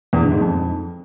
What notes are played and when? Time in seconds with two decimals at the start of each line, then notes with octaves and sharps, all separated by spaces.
0.13 E2
0.22 D3
0.32 G#2
0.41 F2